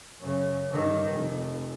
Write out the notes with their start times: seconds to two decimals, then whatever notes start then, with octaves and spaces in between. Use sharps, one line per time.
0.20 F#2 C#3
0.69 G2 D#3
1.11 F1